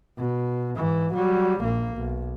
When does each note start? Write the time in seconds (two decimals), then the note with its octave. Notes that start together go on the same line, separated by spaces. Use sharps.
0.18 B2
0.76 G#2 E3
1.14 F#3 G3
1.62 A#1 A#3
1.97 B1